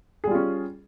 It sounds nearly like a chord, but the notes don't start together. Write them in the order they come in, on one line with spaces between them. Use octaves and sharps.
G#4 G3 F4 C#4